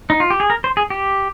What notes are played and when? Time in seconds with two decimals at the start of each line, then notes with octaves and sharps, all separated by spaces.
0.10 D#4
0.20 F4
0.30 G4
0.40 G#4
0.50 A#4
0.64 C5
0.77 G#4
0.90 G4